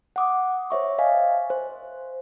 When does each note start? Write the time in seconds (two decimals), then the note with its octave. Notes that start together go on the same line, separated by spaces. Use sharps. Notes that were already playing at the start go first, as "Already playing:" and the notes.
0.16 F#5 D6 D#6
0.70 C5 C#5 E5 C#6
0.99 D#5 F5 G#5
1.50 C5